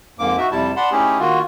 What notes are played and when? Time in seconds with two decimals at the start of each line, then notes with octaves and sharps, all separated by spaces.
0.19 F2 G#2 A#3 D6
0.37 D#4 F#4 E5
0.51 F2 C3 G3 E4 A5
0.76 D5 F#5 A5 B5 C6
0.91 A3 C#4 D#4 E4 G4 G#4
1.19 D#3 A#3 F4 F#4